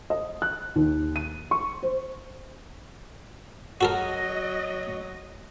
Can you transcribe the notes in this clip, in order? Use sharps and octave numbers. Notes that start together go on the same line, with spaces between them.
D#5
F#6
D#2
D#7
C#6
C5
F#3 F#4 A4 A#4 D#5